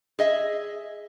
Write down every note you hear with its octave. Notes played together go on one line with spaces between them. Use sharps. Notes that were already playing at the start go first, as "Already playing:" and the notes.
G#4 D#5 E5